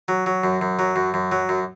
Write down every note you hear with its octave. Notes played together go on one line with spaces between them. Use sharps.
F#3
F#3
F#2
F#2
F#3
F#2
F#2
F#3
F#2